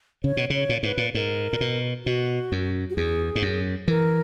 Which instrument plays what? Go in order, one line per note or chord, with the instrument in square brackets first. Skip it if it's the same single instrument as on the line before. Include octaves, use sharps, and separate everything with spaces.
[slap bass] C#3 [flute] C#5
[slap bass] B2
[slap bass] C#3 [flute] C#5
[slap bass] A#2
[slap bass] G#2 [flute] B4
[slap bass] A#2
[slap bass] G#2 [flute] A#4
[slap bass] A#2
B2
[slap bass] B2 [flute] F#4
[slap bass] F#2
[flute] F#4
[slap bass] E2 [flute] G#4
[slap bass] G#2
F#2
[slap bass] E3 [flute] A#4